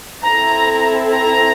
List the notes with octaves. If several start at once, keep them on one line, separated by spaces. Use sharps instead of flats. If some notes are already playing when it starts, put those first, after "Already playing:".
C4 E4 A4 A#5
A#5